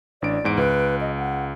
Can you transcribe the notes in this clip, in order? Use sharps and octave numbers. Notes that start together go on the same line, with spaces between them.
A1 D4 D5 D7
E2 G#2 D7
C#2 B4
D#5
F#5